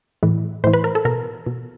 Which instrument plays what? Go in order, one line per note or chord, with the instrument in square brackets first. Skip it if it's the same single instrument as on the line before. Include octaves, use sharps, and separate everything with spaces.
[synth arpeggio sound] A2 E3
A2 E3 C5
B4
A#4
A4
B2 A#4
B2